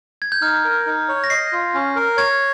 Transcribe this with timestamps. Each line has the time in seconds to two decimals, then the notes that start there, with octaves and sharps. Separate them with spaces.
0.22 G#6
0.32 G6
0.42 D#4 F6
0.65 A#4
0.86 D#4
1.09 C#5
1.24 A#6
1.30 D#5 C7
1.52 F4
1.74 C#4
1.96 A#4
2.17 C#5 G#6